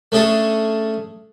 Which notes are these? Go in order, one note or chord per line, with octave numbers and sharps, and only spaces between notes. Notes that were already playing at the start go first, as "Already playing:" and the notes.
A3 C#4 D4 G#4 A4